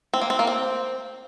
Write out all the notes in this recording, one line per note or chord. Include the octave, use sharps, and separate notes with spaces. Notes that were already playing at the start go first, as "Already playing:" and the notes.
C4
A#3
C4
A#3
C4